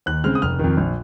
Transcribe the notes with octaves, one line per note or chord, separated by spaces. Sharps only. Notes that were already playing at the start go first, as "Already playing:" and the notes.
D#2 F#6
C#3 G#3 C4 F6
D#6
F1 F6
F2 D#3
A#1